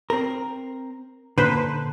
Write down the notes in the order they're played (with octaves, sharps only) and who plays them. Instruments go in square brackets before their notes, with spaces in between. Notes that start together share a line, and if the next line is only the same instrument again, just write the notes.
[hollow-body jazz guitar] C4 A#4
[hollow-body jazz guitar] A#2 D3 [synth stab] B4 C5